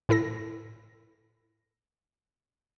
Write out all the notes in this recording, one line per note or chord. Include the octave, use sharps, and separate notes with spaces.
A2 E4 A4 A#6